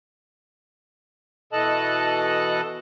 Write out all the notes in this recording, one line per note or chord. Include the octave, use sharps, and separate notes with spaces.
B2 E3 A4 D#5 A5 F#6